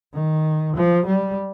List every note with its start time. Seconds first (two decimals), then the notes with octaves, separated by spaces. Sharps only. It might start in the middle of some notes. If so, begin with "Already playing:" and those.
0.14 D#3
0.76 F3
1.06 G3